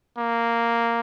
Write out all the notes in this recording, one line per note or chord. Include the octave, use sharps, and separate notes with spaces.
A#3